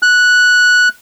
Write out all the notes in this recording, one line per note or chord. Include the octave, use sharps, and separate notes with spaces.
F#6